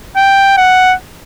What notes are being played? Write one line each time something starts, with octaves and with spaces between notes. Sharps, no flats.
G5
F#5